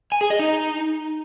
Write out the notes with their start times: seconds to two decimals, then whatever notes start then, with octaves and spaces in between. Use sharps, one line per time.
0.12 G#5
0.21 G#4
0.30 D#5
0.39 D#4